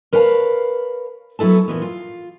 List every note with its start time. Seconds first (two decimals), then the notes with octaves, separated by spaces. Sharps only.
0.13 A#4 B4 C#5 F5 F#5 A5
1.39 F#3 B3 E4 A4 A5
1.68 A#2 E3 B3
1.82 F4